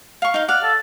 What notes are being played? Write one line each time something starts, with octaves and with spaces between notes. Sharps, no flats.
F5 C#6
D#4 F5
D5 F5 F#5
A4